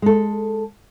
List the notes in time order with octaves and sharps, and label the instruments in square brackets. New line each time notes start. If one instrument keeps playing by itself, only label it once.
[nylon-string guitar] G#3 A4